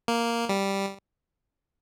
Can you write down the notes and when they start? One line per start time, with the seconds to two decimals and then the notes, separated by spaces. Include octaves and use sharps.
0.08 A#3
0.49 G3